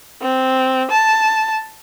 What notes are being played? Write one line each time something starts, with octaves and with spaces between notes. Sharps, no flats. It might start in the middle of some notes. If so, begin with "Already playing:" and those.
C4
A5